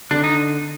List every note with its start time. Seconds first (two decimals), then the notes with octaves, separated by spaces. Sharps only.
0.11 D3 D4
0.24 D#4